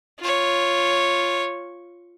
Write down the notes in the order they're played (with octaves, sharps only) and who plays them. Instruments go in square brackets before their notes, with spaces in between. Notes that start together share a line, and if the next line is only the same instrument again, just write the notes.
[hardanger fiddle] F4 C#5